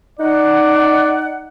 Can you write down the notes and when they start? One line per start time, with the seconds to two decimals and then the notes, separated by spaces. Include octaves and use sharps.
0.19 D#4 D5 F#5